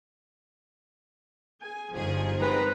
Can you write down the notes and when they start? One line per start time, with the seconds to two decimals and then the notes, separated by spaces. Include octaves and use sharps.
1.61 G#4 G#5
1.93 G1 F3 D#4 G#4
2.39 D#3 G#3 C4 B4 A#5